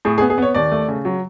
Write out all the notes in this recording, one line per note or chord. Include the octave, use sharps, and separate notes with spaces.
A2 G#4
G#4
B3
G#4
B3 C#5
D#2 D5
A3
C#3
F#3